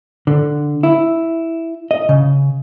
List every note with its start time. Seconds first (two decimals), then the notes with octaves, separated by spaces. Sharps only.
0.27 D3
0.83 E4
1.91 D#5
2.09 C#3